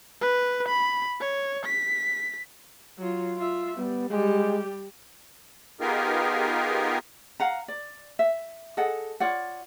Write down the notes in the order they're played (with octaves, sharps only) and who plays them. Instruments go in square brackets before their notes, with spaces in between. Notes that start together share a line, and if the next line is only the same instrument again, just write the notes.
[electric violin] B4
B5
C#5
B6
[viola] F#3 F4
F4 E5
[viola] G3 [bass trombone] B3
[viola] G3 G4 [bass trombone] G#3
[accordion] B3 D#4 F4 G4 G#4 A#4
[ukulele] F5 F#5 A#5
D5
E5
G#4 A4 D#5 F#5
F4 C#5 D5 F#5